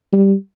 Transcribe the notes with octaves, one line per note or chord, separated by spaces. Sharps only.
G3